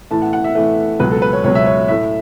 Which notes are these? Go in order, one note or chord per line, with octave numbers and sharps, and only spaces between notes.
A2 E3 A3 A5
F#5
F#5
E5
A2 E3 A3
C#2 B2 F#3 B4
A4
B4
C#5
C#2 B2 F#3 C#5
E5
C#5
A2 A3 E5